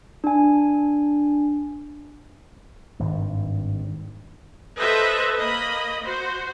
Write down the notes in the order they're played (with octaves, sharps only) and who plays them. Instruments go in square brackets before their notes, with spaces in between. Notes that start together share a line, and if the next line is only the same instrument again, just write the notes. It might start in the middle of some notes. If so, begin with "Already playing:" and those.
[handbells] D4 G#5
[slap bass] G#1 G2
[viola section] A4 B4 C5 D#5 E5
A#3 D#5 B5
F#4 C5